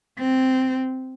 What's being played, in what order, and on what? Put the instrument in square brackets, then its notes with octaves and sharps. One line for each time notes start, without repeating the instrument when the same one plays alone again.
[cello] C4